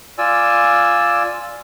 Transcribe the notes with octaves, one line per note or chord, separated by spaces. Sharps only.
F4 D5 G#5 E6